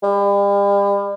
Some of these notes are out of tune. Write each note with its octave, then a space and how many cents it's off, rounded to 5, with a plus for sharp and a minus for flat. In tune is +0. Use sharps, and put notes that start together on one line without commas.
G3 +40